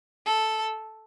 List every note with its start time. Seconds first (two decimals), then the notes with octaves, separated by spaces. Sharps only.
0.26 A4